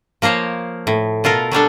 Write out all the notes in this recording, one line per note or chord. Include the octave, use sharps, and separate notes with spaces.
F3 A#3 A#4 C5 C#5
A2
B2 F4 A4 A#4
F#3 G3 D4 A4